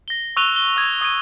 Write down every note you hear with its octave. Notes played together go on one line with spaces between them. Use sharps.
A#6 G7
C#6 E6 F#6 D#7 F7 G7
G7
D#6 E6 G#6
D#6 G#6 D#7